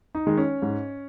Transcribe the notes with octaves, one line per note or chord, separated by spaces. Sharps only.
D#4
D#3 G#3
C#4
G#2